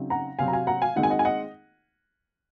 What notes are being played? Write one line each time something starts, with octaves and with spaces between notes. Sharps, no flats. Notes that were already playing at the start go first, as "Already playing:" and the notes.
Already playing: C#3 F#3 C4 D#4
F#5 A#5
C3 F#3 C4 F5 G#5
A#5
F5 G#5
F#5 A#5
F5 G#5
D#3 G#3 C4 D#4 F#5
G#5
D#5 F#5
G#5
D#5 F#5